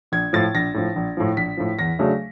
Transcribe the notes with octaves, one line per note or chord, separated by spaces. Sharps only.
A#1 G#6
A2 F3 A6
A#1 A#6
A2 F3
A#1
A2 F3
A#1 B6
A2 F3
E2 A#6
C#3 F#3 A3 D4